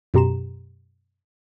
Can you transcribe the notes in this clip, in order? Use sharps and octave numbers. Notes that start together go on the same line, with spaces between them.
F#2 B2 G4 A#5 C6 E7